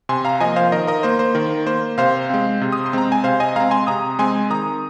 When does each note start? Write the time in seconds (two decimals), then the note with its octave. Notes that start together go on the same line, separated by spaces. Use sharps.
0.09 C3 G#5 C6
0.25 F5 A#5
0.40 F3 A#3 D#5 G#5
0.56 C5 F5
0.72 D#3 A#4 D#5
0.87 A#4 D#5
1.03 A#3 C5
1.19 C5
1.35 D#3 A#4
1.66 A#3 C5
1.98 C3 C5 F5
2.30 G#3 C4
2.61 C3
2.72 D#6
2.86 C6
2.93 G#3 C4 A#5
3.12 G#5
3.24 C3 C5 F5
3.40 D#5 G#5
3.56 G#3 C4 F5 A#5
3.71 G#5 C6
3.87 C3 A#5 D#6
4.19 G#3 C4 G#5 C6
4.50 D#3 A#5 D#6